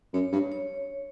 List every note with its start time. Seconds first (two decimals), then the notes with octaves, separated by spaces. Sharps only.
0.13 F#2 C#5
0.32 G2
0.52 C#5